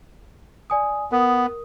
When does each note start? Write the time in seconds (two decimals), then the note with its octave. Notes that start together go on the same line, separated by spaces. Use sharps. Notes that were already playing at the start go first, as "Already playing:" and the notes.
0.70 D5 G#5 D#6
1.12 B3 A#4 D#6